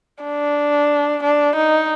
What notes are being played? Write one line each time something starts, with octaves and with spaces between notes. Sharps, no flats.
D4
D4
D#4